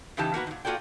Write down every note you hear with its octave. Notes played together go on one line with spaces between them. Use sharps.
C#3 E3 D#4 G4 A5
A#3 B3 F#4 B4
A#2 D#3
A#3 F4 F#4 A4 D5 G5